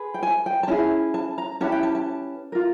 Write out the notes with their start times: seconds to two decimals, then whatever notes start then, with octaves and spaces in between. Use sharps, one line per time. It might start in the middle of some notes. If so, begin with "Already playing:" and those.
Already playing: G#4 B4
0.14 G5
0.23 G#5
0.46 G5
0.63 A5
0.68 C#4 E4 G#4 G#5
1.14 A5
1.38 A#5
1.61 C#4 E4 G4 B4 A5
1.72 G5
1.83 A5
1.95 A5
2.52 F4 A#4